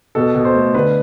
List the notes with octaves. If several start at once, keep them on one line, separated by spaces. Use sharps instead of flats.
B2 A4
B2
C5
A3
D3 B4